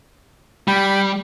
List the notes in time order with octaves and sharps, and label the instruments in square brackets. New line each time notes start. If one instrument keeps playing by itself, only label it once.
[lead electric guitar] G3 [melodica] G5 B5